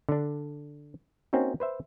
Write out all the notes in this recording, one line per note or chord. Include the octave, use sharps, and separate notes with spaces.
D3 D4
A#3 C4 C#4 D#4 F#4
B4 C5 E5